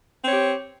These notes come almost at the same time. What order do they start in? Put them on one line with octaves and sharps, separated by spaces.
C4 C#5 G4